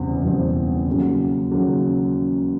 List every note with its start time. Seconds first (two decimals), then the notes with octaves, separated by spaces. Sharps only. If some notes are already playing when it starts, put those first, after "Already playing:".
Already playing: F#1 E2 B2 G3 C4
0.22 F#1 E2 B2 G3 C4
0.87 D#2 C#3 F#3
1.52 D#2 C#3 F#3